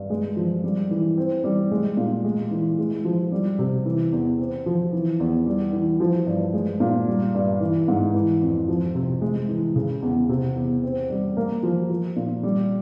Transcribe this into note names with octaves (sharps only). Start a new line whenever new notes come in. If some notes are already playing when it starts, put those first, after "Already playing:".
Already playing: G2
G#3
F3
G3
E3
C4
G3
G#3
A#2
G#3
E3
G#3
F3
G3
C3
E3
E2
C4
F3
E3
E2
G3
E3
F3
G2
G#3
A#2
G3
G2
E3
G#2
E3
F2
F3
C3
G#3
E3
C#3
E2
C3
E2
C4
G3
A#3
F3
F3
A#2
G3